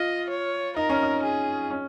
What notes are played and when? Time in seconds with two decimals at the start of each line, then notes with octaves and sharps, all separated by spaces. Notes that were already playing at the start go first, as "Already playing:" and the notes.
Already playing: F4 D#5
0.30 C#5
0.76 D#4 A#4
0.90 C#4
1.03 D#4
1.23 G#4
1.71 C#4